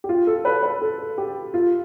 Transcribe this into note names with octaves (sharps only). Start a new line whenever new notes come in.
G4
F4
A4
B4
B4
A4
G4
F4